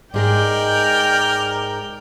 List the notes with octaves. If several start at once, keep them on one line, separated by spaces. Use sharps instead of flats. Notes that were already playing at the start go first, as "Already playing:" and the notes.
G#2 G#4 A#4 D5 D#5 G5 G6